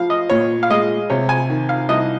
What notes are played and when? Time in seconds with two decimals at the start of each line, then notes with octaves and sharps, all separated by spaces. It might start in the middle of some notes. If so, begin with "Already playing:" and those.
Already playing: F3 F5
0.10 D#5
0.30 A#2 C#5
0.63 F5
0.70 G#3 D#5
1.10 C3 C#5
1.29 G#5
1.50 D#3
1.69 F5
1.89 C2 D#5